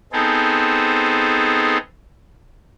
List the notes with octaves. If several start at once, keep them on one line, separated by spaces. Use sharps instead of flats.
B3 C4 D#4 G#4 A4 C5